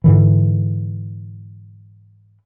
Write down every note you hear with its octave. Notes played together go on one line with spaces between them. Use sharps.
G#2 D3 E3